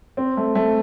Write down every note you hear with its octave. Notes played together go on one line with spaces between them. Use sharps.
C4
A3
A3